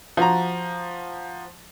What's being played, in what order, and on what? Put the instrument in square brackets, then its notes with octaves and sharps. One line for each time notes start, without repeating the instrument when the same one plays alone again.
[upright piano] F3 F#4 A#5